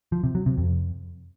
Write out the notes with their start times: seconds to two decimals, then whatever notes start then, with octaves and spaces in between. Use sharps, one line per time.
0.12 F3
0.24 C3
0.35 F#3
0.46 C3
0.58 F2